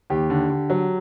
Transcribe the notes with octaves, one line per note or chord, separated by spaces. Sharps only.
D#2 G4
D3
D3
F#3